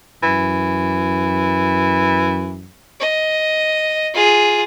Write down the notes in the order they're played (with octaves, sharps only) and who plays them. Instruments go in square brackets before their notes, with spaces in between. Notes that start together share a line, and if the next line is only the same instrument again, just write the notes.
[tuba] F#2 [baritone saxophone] E3
[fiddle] D#5
F4 G#4